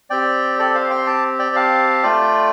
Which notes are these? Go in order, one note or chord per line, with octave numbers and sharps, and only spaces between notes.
C4 G4 D5 G5
A4 D5
C5 F5
G5 C6
A5 D6
D5 G5
F5 A5
A3 F4 D5 G5